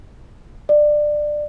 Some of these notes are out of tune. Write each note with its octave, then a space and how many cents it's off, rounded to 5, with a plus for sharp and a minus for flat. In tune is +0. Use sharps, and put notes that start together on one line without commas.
D5 +20